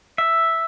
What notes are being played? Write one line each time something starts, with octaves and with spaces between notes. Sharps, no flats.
E5